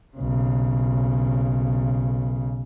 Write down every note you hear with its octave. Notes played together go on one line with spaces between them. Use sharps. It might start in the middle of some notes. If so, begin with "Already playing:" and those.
B1 C#3